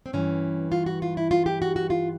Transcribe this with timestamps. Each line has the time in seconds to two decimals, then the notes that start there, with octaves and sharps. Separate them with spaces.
0.06 C4
0.13 G2 E3 C#4
0.72 F4
0.86 F#4
1.02 F4
1.17 E4
1.31 F4
1.46 G4
1.62 F#4
1.76 F#4
1.90 F4